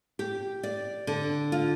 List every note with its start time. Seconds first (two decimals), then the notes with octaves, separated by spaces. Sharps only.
0.19 G4
0.63 D5
1.07 D3
1.52 F4